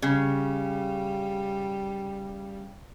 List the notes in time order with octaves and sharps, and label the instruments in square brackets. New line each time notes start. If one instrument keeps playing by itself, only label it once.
[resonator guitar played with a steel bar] C#3 [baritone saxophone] G3